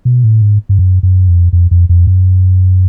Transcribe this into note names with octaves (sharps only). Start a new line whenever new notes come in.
B2
A2
G#2
G2
F#2
F#2
F2
F2
F2
F2
F#2